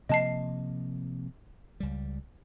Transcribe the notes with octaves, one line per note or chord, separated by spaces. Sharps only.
C3 F3 A#3 D#5 A5 C7
C#2 G3